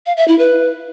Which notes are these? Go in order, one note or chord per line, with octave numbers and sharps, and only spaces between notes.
F5
E5
E4
B4